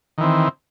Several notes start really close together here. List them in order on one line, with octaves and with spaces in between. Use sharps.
D#3 E3 C4